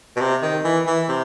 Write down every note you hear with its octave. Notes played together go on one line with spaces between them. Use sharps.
B2
C3
D#3
E3
E3
C3